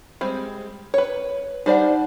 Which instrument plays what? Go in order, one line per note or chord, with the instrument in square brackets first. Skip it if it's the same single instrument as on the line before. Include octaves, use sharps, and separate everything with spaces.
[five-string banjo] G3 G#3 C4
B4 C#5
[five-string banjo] G3 C5 D5 [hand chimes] D#4 F#5